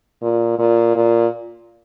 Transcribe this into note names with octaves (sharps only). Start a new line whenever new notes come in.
A#2
A#2
A#2